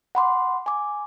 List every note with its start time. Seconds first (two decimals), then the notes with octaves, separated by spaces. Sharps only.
0.15 F#5 B5 C6 D6
0.66 G#5 D6